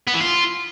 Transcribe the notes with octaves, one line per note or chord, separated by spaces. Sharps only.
B3
E3
F4